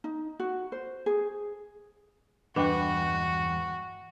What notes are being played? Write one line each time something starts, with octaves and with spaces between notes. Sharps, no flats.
D#4
F#4
C5
G#4
E2 G2 D4 F#4 B4 D#5 G5